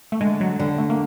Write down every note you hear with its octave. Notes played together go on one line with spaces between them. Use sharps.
A3
D3 G#3
F#3
D3 G3
A3
A#3